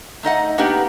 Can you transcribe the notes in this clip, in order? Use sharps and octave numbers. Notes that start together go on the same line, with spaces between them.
A3 D#4 D#5 F#5
A#3 B3 D4 D#4 G4